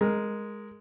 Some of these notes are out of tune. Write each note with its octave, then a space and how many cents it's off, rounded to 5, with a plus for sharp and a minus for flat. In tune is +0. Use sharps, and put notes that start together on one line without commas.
G#3 +0 A#4 +5